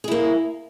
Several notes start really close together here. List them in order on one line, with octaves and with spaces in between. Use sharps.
G#4 E4 A#3